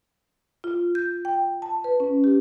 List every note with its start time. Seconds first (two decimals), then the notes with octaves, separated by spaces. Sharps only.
0.64 F4
0.95 G6
1.25 G5
1.62 A5
1.84 B4
2.00 C#4
2.24 G4